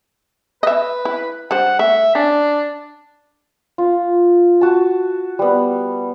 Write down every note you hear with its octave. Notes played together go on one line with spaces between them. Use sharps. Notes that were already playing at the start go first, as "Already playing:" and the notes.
B4 D#5 E5
E4
G3 D4 C5 F#5
A3 E5
C#4 D4
F4
F#4 A5
G3 B3